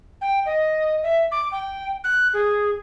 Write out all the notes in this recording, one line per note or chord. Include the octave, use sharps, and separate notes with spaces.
G5
D#5
E5
D6
G5
F#6
G#4